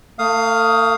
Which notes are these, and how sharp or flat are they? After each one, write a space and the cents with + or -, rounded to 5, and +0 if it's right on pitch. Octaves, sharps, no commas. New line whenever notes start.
A3 +40 F5 +0 D#6 +5